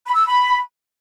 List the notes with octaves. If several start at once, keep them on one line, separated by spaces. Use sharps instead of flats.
B5
E6
B5